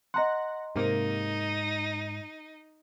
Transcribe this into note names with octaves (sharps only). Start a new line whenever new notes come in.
D#5 F#5 A#5 C6 A#6
G#2 C3 A#3 D#4